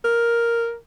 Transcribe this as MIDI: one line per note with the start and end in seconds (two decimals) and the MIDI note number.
0.04 0.76 70